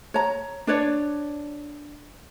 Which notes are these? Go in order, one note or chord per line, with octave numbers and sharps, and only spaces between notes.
C#5 A#5
D4 B4 C#5 D5